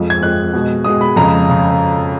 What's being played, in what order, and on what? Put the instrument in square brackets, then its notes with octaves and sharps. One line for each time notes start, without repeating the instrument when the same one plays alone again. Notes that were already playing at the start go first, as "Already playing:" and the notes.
Already playing: [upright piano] F2 F3 G#3
G#6
F2 F3 G#3 F#6
B2 G#3
B2 G#3 D#6
B5
F2 C#3 G#3 A#5
C#3